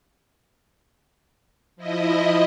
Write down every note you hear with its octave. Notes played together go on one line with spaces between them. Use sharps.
F3 E4 D#5